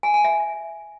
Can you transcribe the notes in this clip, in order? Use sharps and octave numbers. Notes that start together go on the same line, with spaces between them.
G#5
G#5
E5